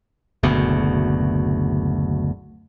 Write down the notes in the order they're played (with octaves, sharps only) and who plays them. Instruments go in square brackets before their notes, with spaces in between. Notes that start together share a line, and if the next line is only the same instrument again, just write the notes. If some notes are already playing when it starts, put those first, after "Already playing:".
[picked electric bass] F#1 D2 B2